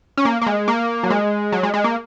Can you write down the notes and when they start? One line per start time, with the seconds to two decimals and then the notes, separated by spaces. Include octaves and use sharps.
0.17 C#4
0.25 A#3
0.42 A#3
0.47 G#3
0.68 A#3
1.03 F#3
1.10 G#3
1.52 F#3
1.63 G#3
1.74 G#3
1.84 A#3